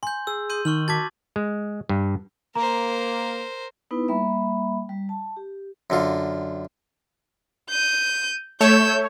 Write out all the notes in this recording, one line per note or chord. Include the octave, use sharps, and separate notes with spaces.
G#5 C6 G6
G#4 E6
C6 G6 D#7
D#3 D#4 C#6 F6 F#7
F#4 A5 D6 G#6 A6 B6
G#3
G2
A#3 A#4 C5 A#5
B3 D#4 E4 B4
G3 A#3 E5 B5
G3
A5
G4
F#2 D3 F4
G6 D#7
A3 C#5 E6 G6